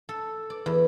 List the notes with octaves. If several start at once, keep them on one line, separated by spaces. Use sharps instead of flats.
A4
D5
E2